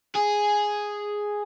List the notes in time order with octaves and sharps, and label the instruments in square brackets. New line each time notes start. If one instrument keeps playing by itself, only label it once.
[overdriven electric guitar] G#4